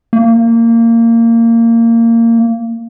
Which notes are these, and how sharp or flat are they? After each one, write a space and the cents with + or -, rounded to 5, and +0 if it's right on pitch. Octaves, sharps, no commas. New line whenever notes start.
A#3 -20